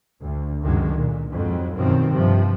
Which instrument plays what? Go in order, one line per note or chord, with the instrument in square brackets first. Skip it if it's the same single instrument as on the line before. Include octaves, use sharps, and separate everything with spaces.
[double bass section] D2
C#2 F#2 D3 D#3 G#3
A#2
F2 G#2 F#3
F#2 B2 D#3 F3 C4
G2 C3 F3